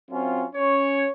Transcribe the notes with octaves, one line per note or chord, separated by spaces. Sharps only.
F#2 C4 C#4 F4
C#4 C#5